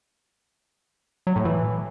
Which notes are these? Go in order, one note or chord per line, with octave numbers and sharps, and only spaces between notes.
F#3
A2
E3